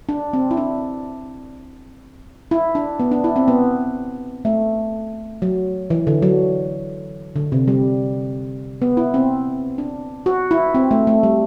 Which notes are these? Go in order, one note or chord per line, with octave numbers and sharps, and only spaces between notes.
D4
C4
E4
D4
E4
D4
B3
D4
E4
C4
B3
A3
F#3
E3
D3
F#3
D3
C3
G3
B3
E4
C4
D4
F#4
E4
C4
A3
A3
G3